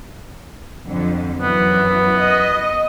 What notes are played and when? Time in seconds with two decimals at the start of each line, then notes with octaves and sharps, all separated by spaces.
0.86 F2 D3
1.40 F#2 E3 B3
2.18 D#5